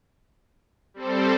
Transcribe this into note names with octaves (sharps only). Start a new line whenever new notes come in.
G3 C4 A4 C5